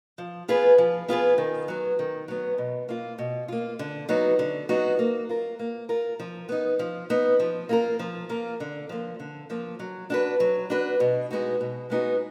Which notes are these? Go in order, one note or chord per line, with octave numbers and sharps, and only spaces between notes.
F3
B3 F4 G#4 B4
F3
B3 F4 G#4 B4
D#3
F#3 B3
D#3
F#3 B3
B2
A#3 F4
B2
A#3 F4
D3
F#3 B3 D#4 F#4
D3
F#3 B3 D#4 F#4
A#3
F4 A#4
A#3
F4 A#4
F3
B3 D#4
F3
B3 D#4
F3
A#3 F4 A#4
F3
A#3 F4 A#4
D3
F3 A#3
D3
F3 A#3
F#3
D4 F#4 B4
F#3
D4 F#4 B4
B2
G#3 B3 D#4 F#4
B2
G#3 B3 D#4 F#4